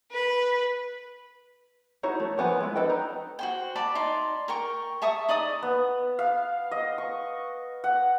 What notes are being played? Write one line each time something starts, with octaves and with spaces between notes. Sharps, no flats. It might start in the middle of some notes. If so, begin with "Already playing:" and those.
B4
D#4 E4 F#4 C#5
A3
F3 B3 G#5 B5
G#3 E4
D4 A4 B4 D#5 G5
D#4
F#4 C5 G5
D5 A5 B5
D#4 D5 C6
A#4 G5 C#6
E5 A5 C#6 D#6
D#4 D5 D#5 D#6
B3
F5
D#5
C#6
F#5